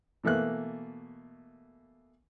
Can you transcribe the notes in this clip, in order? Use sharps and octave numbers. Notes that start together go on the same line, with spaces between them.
B2 E3 A3 A#3 F#6